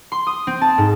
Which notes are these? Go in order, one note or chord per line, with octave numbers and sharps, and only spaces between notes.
C6
D#6
C4
A5
G#2